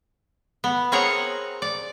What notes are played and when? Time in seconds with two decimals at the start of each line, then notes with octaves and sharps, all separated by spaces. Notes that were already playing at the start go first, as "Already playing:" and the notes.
0.64 B3
0.92 C4 G#4 A#4 C#5 F#5 A#5
1.62 D5